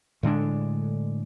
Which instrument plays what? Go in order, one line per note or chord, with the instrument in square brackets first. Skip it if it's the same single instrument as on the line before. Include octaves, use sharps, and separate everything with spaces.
[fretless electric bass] A2 D3 G#3 D4